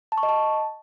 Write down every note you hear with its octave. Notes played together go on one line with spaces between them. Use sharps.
A5
C#6
D#5
A5